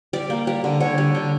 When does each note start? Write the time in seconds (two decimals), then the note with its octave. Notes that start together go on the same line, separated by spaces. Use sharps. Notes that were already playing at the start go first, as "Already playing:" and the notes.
0.13 G3 D5
0.30 A#3
0.47 G3
0.64 D3
0.80 D3 C#5
0.98 G3
1.15 D3